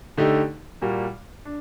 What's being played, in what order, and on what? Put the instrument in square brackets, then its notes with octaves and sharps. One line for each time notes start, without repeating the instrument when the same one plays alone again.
[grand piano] D3 A3 D#4 G4
A#2 G3 A#3 F#4
D4